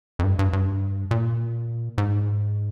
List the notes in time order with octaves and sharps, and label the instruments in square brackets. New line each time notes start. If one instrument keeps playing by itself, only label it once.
[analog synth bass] F2
G2
G2
G2
A#2
G#2